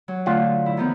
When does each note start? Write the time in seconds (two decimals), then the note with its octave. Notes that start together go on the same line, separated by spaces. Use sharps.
0.08 F#3
0.26 D3 A3 F4 F#5
0.66 E4
0.77 D#3 F3 B3